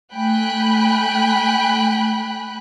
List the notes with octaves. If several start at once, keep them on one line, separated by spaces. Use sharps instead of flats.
A3 G5 G#5 B5 F#6